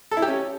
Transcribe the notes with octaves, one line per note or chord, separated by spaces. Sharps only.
A4
E4
G4
C#4